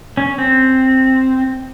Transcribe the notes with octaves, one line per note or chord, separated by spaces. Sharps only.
C#4
C4